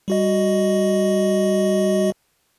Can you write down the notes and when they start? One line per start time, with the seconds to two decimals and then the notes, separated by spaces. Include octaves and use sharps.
0.08 G3 F#4 D#5